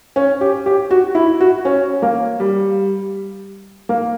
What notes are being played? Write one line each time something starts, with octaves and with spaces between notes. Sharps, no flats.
C#4
G4
G4
F#4
E4
F#4
C#4
A#3
G3
A#3